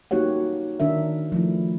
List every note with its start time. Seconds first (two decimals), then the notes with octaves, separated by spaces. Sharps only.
0.11 A#3 D#4 F#4 G4 C#5 F#5
0.80 D#3 D4 A#4 E5
1.32 F3 A3 E4